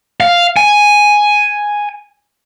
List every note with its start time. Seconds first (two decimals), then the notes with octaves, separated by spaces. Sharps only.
0.20 F5
0.57 G#5